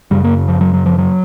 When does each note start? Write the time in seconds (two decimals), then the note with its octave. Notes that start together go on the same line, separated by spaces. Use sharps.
0.11 F#2 C#3 G3
0.24 A#3
0.48 F3
0.61 F#3
0.73 F#3
0.86 F3
0.98 F#3